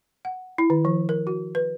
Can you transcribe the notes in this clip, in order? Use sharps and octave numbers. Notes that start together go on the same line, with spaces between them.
F#5
E4
D#3
F3
A#4
F#4
B4